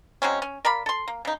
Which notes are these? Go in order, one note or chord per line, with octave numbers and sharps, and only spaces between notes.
F#3 G#3 C4 C#4
C#4
A#4 D5 F5 B5
A4 C6
A#3
C#3 D#4